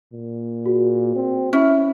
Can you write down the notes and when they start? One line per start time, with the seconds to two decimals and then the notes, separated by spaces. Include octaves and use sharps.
0.13 A#2
0.66 F#4 G#4
1.16 C4
1.53 C#4 E4